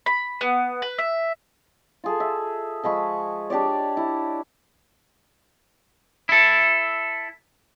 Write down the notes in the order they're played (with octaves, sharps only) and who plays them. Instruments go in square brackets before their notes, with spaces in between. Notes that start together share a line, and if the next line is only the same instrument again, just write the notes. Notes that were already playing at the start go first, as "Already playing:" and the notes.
[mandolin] B5
B3
B4
E5
[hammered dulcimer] F4 G#4 A4
E5
F3 G#3 B5 C#6
D4 G4 C#5 D5
E4
[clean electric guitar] E4 A4